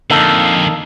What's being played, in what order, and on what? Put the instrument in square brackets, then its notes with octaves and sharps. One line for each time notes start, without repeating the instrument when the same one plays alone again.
[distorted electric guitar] F2 D3 [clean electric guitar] A#3 D#4 A4